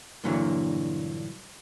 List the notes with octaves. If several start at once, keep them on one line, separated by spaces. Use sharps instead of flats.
G2 A#2 D3 E3 F#3